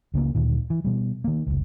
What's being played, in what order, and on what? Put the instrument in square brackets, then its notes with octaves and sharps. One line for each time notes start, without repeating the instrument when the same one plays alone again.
[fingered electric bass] C#2 C#3 A3 A#3
D2 A#2 D#3
E3
B2 G3
D#3 A#3
F1 C#2